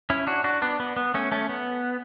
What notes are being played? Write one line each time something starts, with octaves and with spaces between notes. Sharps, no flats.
C#4 E4
D4 F#4
D4 F#4
B3 D4
B3
B3
A3 C#4
A3 C#4
B3